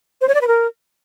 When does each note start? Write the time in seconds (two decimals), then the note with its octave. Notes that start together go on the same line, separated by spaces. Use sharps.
0.21 C5
0.28 C#5
0.34 D5
0.41 B4
0.48 A#4